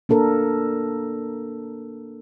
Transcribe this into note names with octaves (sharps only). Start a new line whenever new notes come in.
A#3 D4 A4 A#4